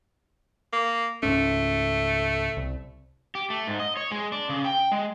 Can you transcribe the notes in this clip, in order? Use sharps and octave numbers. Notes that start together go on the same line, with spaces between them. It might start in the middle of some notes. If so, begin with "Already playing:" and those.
A#3
C#2 G#2 A3 C#4
C2
G4
A3
G#2
D#5
C#5
G#3
D4
C#3
G5
G#3